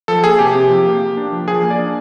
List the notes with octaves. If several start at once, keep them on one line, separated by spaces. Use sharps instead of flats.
F3 A4
A#3 G#4
C3 G4
C3
F3
A#3
A#3
D4
F3
F3 G#4
A#3
D5
D4